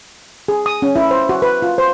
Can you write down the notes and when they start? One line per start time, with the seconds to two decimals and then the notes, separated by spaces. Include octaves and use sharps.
0.48 G#4
0.66 D#6
0.82 C#4
0.96 E4
1.11 C5
1.29 F#4
1.42 B4
1.62 F4
1.78 C5